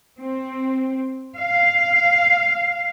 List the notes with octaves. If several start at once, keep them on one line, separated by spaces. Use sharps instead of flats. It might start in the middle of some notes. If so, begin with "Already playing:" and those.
C4
F5